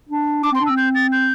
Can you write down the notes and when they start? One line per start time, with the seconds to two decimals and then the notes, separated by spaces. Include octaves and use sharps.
0.09 D4
0.43 D4 D6
0.52 C4
0.55 C6
0.60 D4
0.66 E6
0.69 C4
0.77 G6
0.95 A6
1.12 G6